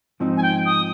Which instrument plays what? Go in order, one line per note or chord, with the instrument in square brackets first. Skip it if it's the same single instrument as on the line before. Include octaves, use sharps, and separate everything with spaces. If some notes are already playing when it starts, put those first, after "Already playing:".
[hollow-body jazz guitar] G#2 F3 C4 D#4
[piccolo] G#5
G5
D#6